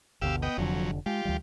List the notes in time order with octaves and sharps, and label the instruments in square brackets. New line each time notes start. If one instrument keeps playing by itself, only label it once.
[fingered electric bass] G1 D2 B2 [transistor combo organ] G4 F5 E6
[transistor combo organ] B3 D#5 G5
[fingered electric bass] F1 D3 [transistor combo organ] F2 F#3
[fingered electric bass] G#3 [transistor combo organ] F4 G4
[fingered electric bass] D2 E3 G3